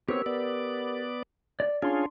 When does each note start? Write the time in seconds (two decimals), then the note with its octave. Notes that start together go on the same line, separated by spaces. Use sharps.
0.09 B3 C4 G4 A#4 C#5 E6
0.26 B3 D5
1.60 D5
1.82 C#4 D4 F4 G#4 C6